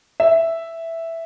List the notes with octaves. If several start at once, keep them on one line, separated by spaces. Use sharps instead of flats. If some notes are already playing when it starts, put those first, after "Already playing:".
E5